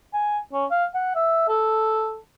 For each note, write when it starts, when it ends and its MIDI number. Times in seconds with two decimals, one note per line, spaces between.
0.13 0.39 80
0.53 0.65 61
0.71 0.85 77
0.94 1.14 78
1.15 1.46 76
1.48 2.18 69